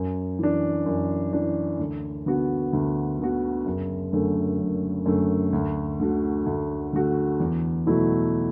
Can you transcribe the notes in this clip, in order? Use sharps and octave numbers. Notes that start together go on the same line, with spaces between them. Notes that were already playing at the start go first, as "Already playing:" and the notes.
Already playing: F#2
E3 D4
F#2
E3 D4
D2
D3 B3 F#4
D2
D3 B3 F#4
F#1
F#2 D3 A3
F#1
F#2 D3 A3
D2
D3 A3 F#4
D2
D3 A3 F#4
E2
B2 F#3 A3 E4